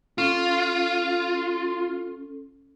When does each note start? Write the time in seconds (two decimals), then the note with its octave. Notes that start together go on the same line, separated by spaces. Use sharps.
0.18 C#4 F4 A4